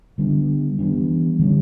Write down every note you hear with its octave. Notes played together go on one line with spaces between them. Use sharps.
D3 G3 B3 D4
E3 G3 B3 D4
D3 G3 C#4